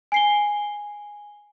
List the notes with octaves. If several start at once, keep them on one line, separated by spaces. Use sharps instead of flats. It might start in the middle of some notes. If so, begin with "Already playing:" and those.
G#5 C7 G7